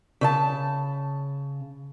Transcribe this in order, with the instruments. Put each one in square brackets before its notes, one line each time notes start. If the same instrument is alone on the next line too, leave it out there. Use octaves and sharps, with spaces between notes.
[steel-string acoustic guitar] C#3 E5 A5